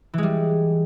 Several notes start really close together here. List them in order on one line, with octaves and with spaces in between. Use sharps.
E3 G#3 G3